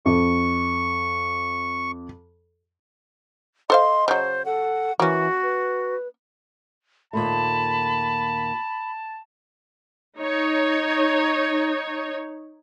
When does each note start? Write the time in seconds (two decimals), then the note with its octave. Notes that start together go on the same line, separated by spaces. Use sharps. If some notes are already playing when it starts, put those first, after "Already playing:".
0.06 F2 C#6
3.70 A4 C5 D#5 F5 C6
4.08 C#3 F#3 C5
4.45 A4 F#5
5.00 E3 A#3 C#4 F#4
5.43 B4
7.13 D#2 A#2 A3 A5 B5
10.19 D#4 C#5